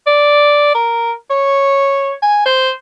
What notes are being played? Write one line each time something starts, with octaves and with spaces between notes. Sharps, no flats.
D5
A#4
C#5
G#5
C5